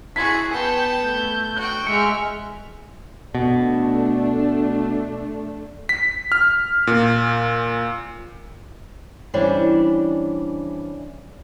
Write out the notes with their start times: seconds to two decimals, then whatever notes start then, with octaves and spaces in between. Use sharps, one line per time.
0.16 E4 F#4 G#4 C6 G#6 B6
0.52 B3 G5 A5 C#7
1.01 A3 G6
1.56 F#4 G5 F#6
1.87 G#3 E5 F6 C#7
3.35 B2 A3 D4
5.89 B6
6.32 F6
6.87 A#2
9.34 E3 G3 C#4 D4 C5